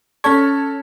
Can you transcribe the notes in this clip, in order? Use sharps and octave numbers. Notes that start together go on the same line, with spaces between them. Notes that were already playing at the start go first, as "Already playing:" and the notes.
C#4 A4 C#5 C#6 G#6